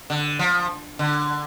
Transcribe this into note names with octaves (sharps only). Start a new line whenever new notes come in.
D3
F3
D3